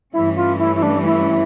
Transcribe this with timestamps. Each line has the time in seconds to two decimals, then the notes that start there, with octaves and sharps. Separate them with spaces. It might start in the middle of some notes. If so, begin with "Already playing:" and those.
0.13 G2 E3 A3 C#4 E4
0.37 F4
0.59 E4
0.76 E4
0.83 D4
1.05 E4